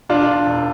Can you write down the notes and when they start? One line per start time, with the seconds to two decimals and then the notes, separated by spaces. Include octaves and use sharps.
0.09 E1 D4 F4
0.46 E1